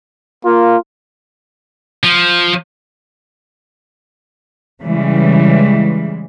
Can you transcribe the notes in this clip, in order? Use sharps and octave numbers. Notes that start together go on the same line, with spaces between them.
A#3 F4
F3
C#3 E3 G3 G#3